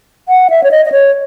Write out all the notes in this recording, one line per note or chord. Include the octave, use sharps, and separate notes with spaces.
F#5
E5
C#5
D#5
D#5
C#5